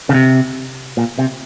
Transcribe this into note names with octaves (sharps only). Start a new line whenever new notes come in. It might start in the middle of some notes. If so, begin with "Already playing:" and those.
C#3
C3
A#2
C3